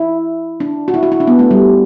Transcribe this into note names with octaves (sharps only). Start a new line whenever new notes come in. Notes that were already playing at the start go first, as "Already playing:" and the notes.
Already playing: E4
D4
F#4
E4
F#4
E4
D4
B3
A3
G3